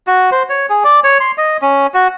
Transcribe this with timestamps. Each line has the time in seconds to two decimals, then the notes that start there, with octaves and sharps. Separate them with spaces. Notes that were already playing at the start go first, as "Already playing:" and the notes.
0.07 F#4
0.32 C5
0.50 C#5
0.69 G#4
0.84 D5
1.04 C#5
1.20 C6
1.38 D#5
1.62 C#4
1.94 F#4